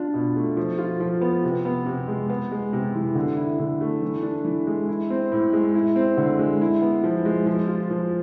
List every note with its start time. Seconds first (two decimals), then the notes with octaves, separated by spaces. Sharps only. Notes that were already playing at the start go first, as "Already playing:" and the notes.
Already playing: D4 F4
0.14 B2
0.36 A3
0.57 F3
0.78 F4
1.00 F3
1.21 B3
1.44 C3
1.65 B3
1.86 C3
2.08 G#3
2.30 B3
2.51 G#3
2.73 C3
2.95 E3
3.15 D3
3.37 E4
3.59 D3
3.81 A3
4.02 E3
4.23 D4
4.45 E3
4.67 G#3
4.89 E4
5.10 C4
5.32 A2
5.53 G#3
5.75 E4
5.96 C4
6.17 D3
6.39 G#3
6.61 E4
6.82 B3
7.04 F3
7.25 G#3
7.46 F3
7.68 F4
7.90 F3